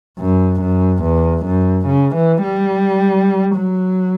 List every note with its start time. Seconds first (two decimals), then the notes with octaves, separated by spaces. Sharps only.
0.19 F#2
0.61 F#2
1.03 E2
1.46 F#2
1.87 C#3
2.16 E3
2.44 G3
3.56 F#3